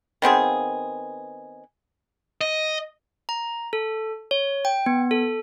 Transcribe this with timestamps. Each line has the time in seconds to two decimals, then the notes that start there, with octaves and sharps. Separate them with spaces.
0.22 D#3 B3 C4 G#4
2.41 D#5
3.29 A#5
3.73 A4
4.31 C#5
4.65 G5
4.86 B3
5.11 A4